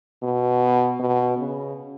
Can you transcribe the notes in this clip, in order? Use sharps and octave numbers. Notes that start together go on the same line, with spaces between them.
B2
B2
C#3